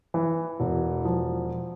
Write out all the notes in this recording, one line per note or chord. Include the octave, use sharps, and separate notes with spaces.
E3
E1
F3